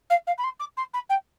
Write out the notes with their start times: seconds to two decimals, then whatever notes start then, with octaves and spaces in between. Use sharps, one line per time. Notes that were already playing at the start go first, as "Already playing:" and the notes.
0.10 F5
0.27 F5
0.38 B5
0.43 C6
0.59 D6
0.77 C6
0.93 B5
1.09 G5